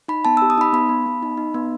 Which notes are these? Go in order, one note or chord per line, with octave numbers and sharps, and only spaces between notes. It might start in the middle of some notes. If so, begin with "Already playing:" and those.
D#4 B5
B3 A5
G4 E6
D#6
D#4 B5
B3 B5
B3
B3
D#4
D#4
B3